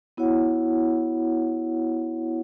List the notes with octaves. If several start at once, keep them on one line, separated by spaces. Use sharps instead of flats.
B3 E4 F#4 C#5 F#5